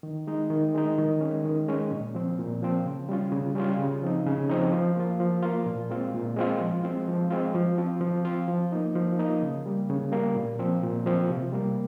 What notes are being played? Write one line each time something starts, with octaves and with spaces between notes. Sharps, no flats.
D#3
G#3 D#4
D#3
G#3 D#4
D#3
G#3 C#4
D#3
G#3 C#4
A#2
F3 C4
A#2
F3 C4
C#3
G3 C#4 F4
C#3
G3 C#4 F4
C#3
F3 C4 D#4
C#3
F3 C4 D#4
F3
A#3 F4
F3
A#3 F4
A#2
G#3 C4 F4
A#2
G#3 C4 F4
F3
G#3 C4 F4
F3
G#3 C4 F4
F3
C4 F4
F3
C4 F4
F3
A#3 D#4
F3
A#3 D#4
C#3
G3 A#3
C#3
G3 A#3
A#2
F3 C4
A#2
F3 C4
C3
G3 A#3